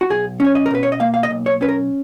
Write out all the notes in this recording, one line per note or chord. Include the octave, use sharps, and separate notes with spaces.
F#4
B1 G#4
C#4 C#5
D#5
A#4
B2 B4
C#5
D#5
A#3 F5
F5
D#5
B1
C#5
C#4 B4
A#4